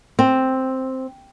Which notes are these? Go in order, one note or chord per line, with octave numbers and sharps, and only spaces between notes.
C4